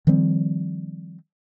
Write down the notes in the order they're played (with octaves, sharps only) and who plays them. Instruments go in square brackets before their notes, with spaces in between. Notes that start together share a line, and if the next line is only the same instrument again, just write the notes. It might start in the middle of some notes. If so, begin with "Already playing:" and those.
[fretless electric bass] D#3 F3 G3 C4